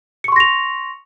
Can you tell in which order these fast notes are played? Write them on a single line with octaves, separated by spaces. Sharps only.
C#7 C#6 C6 A#6 F7